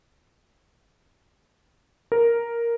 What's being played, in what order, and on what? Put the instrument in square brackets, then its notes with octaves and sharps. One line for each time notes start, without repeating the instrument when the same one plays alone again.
[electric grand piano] A#4